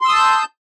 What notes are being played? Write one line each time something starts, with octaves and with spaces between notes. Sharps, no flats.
A5 C6 D#6 E6 G6